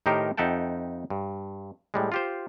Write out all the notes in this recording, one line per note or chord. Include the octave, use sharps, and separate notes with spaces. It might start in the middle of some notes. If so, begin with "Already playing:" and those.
A2 D#3 D#4 G4 A#4 C5
F2 D#4 E5 F#5 G5 A5
G2
A2 G3 G#3
F4 G4 C5